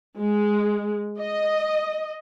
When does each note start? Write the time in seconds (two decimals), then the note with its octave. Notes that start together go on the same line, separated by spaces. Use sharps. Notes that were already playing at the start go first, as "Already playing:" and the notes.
0.18 G#3
1.20 D#5